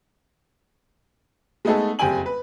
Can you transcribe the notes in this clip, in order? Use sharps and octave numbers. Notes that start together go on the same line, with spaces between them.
G#3 A3 B3 D#4 G#4 A4
F#1 F2 G3 G5 G#5 F#7
B4